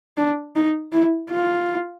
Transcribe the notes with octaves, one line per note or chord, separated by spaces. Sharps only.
D4
D#4
E4
F4